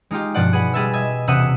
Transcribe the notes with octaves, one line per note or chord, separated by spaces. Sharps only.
G#3 D#4 F4 G4
G2 B2 F3 D5 F#5
G#4 B4 F#5
G3 G#4 A4 E5
D#5 E5 G#6
E1 C3 E5 F#5 D#6 F#6